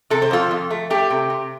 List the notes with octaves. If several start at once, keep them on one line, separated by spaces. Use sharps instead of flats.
C3 A4
C5
F2 F4 A4
F2
A3
A3 G4
C3
C3